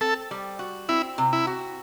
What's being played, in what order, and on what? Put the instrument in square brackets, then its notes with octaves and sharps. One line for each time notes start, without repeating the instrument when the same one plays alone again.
[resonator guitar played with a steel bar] C4 [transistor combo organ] A4
[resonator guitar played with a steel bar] G3
F#4
[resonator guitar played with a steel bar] C4 [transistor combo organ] E4
[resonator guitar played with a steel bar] C3
[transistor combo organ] E4
[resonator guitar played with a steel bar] F#4